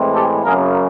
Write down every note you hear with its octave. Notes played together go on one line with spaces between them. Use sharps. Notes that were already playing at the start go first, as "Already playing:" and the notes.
Already playing: A2 E3 G#3 C4
G4 A4
F#2 C#3 F#3 A#3 G#4 A#4